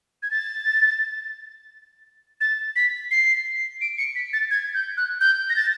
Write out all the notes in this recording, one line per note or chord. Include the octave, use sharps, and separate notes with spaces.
G#6
A6
A6
B6
C7
D7
C#7
B6
A6
G#6
G6
F#6
G6
A#6
A6